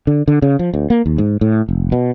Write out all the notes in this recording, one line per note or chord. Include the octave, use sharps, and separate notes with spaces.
D3
D3
C#3
F3
D2
A#3
D#2
G#2
A2
F1
B2